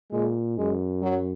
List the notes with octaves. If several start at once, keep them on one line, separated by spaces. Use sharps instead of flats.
A#2 G#3
F#2 G#3
F#3